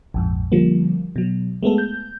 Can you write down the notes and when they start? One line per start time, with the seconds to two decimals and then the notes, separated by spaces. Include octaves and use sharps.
0.14 A#1 F2 G#2
0.52 D3 F3 G3 A#3
1.16 B2 F#3
1.63 G#3 A3 B3 A4
1.78 G6